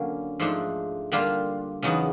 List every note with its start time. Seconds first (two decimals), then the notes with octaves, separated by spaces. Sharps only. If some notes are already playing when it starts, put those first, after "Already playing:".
Already playing: D3 F#3 A#3 C#4
0.40 G#2 F3 A3 D4
1.12 D3 G3 A#3 D4 F4
1.83 E2 C#3 F#3 B3 D#4